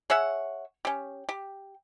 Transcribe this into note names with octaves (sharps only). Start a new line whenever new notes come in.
G#4 C#5 E5 F#5
C#4 G4
G4